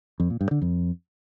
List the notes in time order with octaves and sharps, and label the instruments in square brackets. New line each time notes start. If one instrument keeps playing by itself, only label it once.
[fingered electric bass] F2
A#2
G2
D3
F2